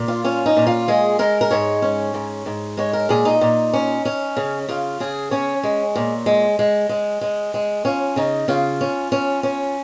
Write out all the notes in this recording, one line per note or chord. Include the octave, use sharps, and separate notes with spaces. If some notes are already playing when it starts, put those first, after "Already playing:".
Already playing: A#2
F4
C#4 F4
D#4
A#2
F4
G#3 G#4
G#3 A#4
A#4
G#2 C#5
C#4
G#2
G#2
G#3 C#5
A#4
A#2 G#4
D#4
A#2
C#4
C#4
C#3
C#3 F4
C#3 G#4
C#4 C#5
G#3
A#2
G#3
G#3
G#3
G#3
G#3
C#4 F4
C#3 D#4
C#3 F4
C#4
C#4
C#4